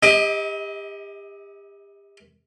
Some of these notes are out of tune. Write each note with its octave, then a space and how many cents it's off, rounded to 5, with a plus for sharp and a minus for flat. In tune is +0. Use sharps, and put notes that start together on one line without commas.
E4 -45 G4 +35 D#5 +20